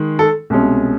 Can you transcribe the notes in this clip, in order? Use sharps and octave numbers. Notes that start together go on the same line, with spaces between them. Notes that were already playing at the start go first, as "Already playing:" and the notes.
Already playing: D#3 G#3
A4
C2 B2 G#3 C#4